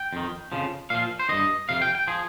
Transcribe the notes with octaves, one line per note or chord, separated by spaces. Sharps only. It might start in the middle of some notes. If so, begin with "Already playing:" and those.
Already playing: G5
F2 D#3
F2 C#3 F3
A#2 F3 F5
C5
G2 D#3 D#5
F2 C3 F5
G5
G5
F3 G#4